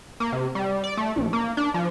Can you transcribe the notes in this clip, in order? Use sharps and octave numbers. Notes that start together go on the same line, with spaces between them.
A#3
C3
G3
D5
A3
A#1
A#3
D4
F3